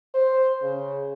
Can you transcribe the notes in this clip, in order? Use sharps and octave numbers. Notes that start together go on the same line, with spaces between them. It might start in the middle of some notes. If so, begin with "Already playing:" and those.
C5
C#3